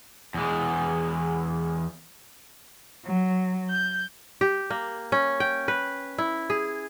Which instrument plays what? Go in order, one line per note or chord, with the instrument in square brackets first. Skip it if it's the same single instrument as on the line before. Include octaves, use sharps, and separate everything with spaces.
[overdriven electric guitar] E2 G#3
[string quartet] F#3
G6
[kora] G4
A#3
C#4
G5
B4
E4
G#4